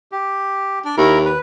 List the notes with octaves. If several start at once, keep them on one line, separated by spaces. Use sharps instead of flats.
G4
D4
D#2 E4 A#4 A#5
B4